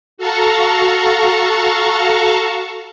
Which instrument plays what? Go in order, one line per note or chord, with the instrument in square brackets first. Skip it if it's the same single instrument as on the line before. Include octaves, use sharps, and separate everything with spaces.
[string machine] F#4 A4 F5 A5 A#5 C#6